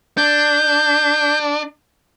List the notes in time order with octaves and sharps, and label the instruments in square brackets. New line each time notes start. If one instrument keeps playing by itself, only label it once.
[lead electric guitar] D4 [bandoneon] G6